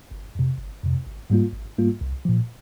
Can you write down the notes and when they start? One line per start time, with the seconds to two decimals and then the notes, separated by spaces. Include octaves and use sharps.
0.11 G1
0.35 F2 C3
0.59 G1
0.83 F2 C3
1.07 G#1
1.30 G#2 G3 A#3 F4
1.54 G#1
1.78 G#2 G3 A#3 F4
2.01 C2
2.25 A#2 F3